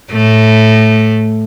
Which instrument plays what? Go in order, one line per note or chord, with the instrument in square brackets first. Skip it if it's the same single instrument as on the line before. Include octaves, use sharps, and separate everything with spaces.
[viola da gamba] A2 A3